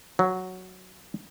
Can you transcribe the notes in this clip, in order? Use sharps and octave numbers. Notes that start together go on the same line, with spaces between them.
F#3